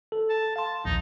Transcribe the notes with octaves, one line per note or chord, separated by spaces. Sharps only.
A4
A5
F5 A5 C6
A#1 D#2 D#4